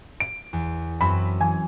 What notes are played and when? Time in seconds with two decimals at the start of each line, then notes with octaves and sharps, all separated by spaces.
0.20 D7
0.53 E2
1.01 F#2 C4 B5 E6
1.41 E3 G#5